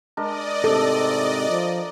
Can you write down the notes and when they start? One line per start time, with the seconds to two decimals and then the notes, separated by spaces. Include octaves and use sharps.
0.17 G#3 D4 A#4 D5 D#5
0.64 G#2 C3 D4 A4 E5
1.49 F3